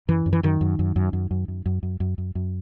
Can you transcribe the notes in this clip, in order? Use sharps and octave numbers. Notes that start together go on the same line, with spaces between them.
F#2 E3
F#2
E3
F#2 D#3
F#2
F#2
F#2
F#2
F#2
F#2
F#2
F#2
F#2
F#2
F#2